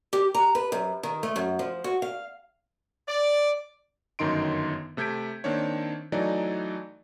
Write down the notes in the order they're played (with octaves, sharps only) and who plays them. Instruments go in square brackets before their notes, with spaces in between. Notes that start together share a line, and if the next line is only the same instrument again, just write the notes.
[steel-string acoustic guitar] G4
A#5
B4
F#2
D#3
A3
F#2
F3
F#4
F5
[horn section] D5
[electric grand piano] G1 F#2 D#3 D#4 C6 D7
C3 A3 G6 G#6 B6 D7
D#3 A#3 C4 D4 C#5
E3 F#3 A3 D#4 D5